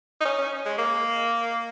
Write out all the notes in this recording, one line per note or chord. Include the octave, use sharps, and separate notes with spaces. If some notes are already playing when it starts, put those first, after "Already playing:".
D#4
C#4
C#4
G#3
A#3